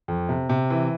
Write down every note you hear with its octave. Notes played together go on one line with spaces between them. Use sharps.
F2
C3
C3
E3